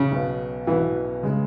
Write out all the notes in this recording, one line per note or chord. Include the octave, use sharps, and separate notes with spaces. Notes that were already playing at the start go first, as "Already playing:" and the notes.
Already playing: C#3
B1 B2 B3
B1 B2 E3 B3
C#3 G#3